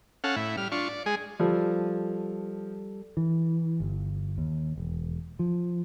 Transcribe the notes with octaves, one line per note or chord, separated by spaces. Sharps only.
C#4 A4 F5 F#5
A2 E4
G3 F6
D4 F4 C#6
D5
G#3 G#4
F3 G3 A4
E3
G1
D#2
E1
F3